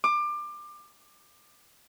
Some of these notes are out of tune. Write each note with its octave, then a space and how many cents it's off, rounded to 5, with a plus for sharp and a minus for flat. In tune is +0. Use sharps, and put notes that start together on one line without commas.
D6 +25